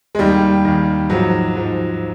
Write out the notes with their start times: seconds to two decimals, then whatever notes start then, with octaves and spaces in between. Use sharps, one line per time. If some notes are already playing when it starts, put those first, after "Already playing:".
0.15 G#3
0.19 D#2 D#3 G3
0.65 D#2 D#3
1.10 G#2 F3 F#3
1.55 G#2 F3